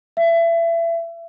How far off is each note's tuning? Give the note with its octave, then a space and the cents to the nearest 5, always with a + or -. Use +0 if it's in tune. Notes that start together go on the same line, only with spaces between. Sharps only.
E5 +30